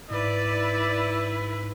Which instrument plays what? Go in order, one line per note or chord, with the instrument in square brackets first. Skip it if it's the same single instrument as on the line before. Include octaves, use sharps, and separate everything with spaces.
[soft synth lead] G#2 [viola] E4 B4 [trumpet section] D5